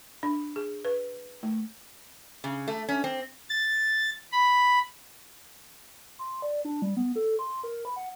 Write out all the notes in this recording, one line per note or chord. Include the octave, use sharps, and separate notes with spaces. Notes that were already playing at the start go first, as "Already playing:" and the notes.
D4
G#4
B4
A3
C#3
A3
C#4
C4
A6
B5
C6
D5
D4
G3
B3
A4
C6
A#4
B5
F#5